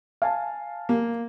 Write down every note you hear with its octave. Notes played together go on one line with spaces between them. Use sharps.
F5 G#5 A5
A#3